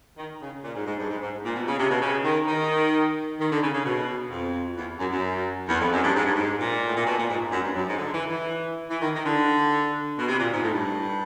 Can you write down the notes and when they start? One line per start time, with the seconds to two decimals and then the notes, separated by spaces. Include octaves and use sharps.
0.17 D#3
0.41 C#3
0.63 A#2
0.75 G#2
0.86 G#2
0.99 G2
1.10 G#2
1.21 G#2
1.45 A#2
1.56 B2
1.67 C#3
1.79 C3
1.90 B2
2.01 C#3
2.24 D#3
2.48 D#3
3.39 D#3
3.51 D3
3.62 C#3
3.74 C#3
3.85 B2
4.31 F2
4.77 E2
4.99 F#2
5.11 F#2
5.69 E2
5.80 F2
5.92 F#2
6.03 G2
6.15 G#2
6.25 G2
6.34 G#2
6.60 A#2
6.86 A2
6.96 A#2
7.06 B2
7.18 A#2
7.30 G#2
7.52 F#2
7.64 G2
7.75 F#2
7.87 G#2
7.98 D3
8.13 E3
8.30 E3
8.90 E3
9.01 D#3
9.14 D#3
9.25 D3
10.19 B2
10.28 C3
10.39 A#2
10.52 G#2
10.62 A2
10.74 G2